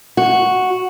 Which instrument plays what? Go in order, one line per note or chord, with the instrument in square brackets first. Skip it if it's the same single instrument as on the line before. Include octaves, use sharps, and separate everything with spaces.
[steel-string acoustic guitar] F#4